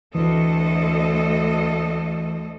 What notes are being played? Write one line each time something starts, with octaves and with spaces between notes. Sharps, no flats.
D2 E3 A4 D#5